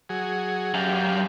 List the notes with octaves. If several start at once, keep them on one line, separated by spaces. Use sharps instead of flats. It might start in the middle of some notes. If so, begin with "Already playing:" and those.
F#3 G#4
F#2 G4 F5